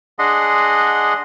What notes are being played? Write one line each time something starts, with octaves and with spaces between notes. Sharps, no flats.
D4 G#4 D#5 F#5 C6